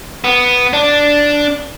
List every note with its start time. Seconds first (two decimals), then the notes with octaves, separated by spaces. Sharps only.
0.24 B3
0.73 D4